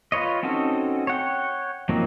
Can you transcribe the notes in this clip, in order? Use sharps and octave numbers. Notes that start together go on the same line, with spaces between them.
F4 B4 C#5 D#5
C4 C#4 D#4 F#4 A4
C#5 F#5 G5
F3 F#3 A#3 C4 D#4